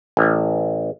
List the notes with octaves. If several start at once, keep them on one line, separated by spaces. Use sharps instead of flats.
A1